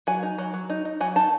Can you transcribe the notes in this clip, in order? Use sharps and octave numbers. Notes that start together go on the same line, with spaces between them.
F#3 G#5
D#4
F#3
F#3
D#4
D#4
F#3 G#5
D#4 A5